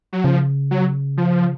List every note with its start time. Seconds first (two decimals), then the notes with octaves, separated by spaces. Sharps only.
0.13 F#3
0.24 C#3 F3
0.71 F#3
1.17 F3